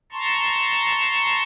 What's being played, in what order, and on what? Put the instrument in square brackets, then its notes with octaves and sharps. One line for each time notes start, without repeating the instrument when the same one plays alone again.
[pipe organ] A5 A#5 C6 C#6